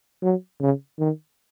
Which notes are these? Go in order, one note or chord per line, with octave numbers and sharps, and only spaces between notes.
F#3
C#3
D#3